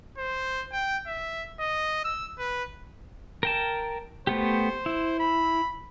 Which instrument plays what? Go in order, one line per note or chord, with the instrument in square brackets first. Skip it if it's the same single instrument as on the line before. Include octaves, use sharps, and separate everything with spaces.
[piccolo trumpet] C5
G5
E5
D#5
E6
B4
[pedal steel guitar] A#4 G5 A5
[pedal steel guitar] A3 B3 G4 [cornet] C5
[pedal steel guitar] E4
[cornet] B5